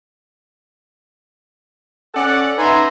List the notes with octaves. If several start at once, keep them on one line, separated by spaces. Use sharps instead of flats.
C#4 A4 D5 F#5
D#4 B4 E5 G#5 A#5 C6